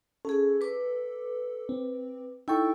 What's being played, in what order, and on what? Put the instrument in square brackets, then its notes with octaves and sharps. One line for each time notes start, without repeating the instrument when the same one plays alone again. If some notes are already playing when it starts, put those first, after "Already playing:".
[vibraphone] C#4 G#4 [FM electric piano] A4
[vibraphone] B4 D6
[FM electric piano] C4
[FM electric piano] D#4 G5 C#6 [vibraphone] E4 A4